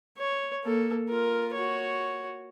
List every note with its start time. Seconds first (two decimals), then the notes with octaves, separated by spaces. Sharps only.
0.18 C#5
0.64 A#3 A4
1.09 F4 A#4
1.54 F#4 C#5